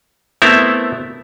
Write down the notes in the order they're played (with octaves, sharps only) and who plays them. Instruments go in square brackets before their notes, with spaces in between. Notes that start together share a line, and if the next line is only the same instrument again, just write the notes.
[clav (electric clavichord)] A3 B3 C4 E4 A#4 E5